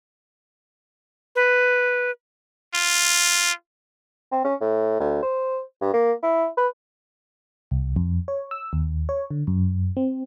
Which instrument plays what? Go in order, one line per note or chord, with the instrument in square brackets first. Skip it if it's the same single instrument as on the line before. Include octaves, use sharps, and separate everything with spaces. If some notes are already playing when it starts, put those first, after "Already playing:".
[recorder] B4
[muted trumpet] F4
[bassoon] C4
C#4
A2
D2
C5
G2
A#3
E4
B4
[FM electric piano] C2
F2
C#5
E6
D#2
C#5
D3
F#2
C4